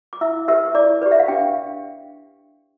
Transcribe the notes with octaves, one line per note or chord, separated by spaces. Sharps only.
D6
E4 E5 E6
G4 B4 E5 E6
E4 D5 D6
G4 B4 D5
E5
F5
D4 G4 G5